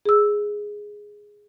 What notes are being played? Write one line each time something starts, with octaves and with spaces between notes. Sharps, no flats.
G#4 E6